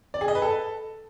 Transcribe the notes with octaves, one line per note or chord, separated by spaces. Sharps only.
D5
G#4
D#5
B4
A4